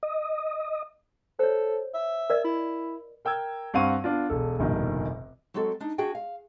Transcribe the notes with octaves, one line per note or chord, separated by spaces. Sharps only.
D#5
A4 C5 C#5
E5
A#4 D5 D#5
E4
A#4 G5 E6 G#6
G2 C4 F5 F#5 C#6 D#7
B3 D4 F4
E1 A4
F1 A#1 G2 B2 D#3
F#3 G#3 C4 F#4 A4
D4 D#4
D4 F#4 G#4 G5
F5